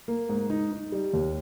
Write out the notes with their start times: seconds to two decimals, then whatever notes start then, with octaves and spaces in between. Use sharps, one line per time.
0.08 A#3
0.29 G#2
0.50 D#4
0.72 D#4
0.92 G3
1.13 D#2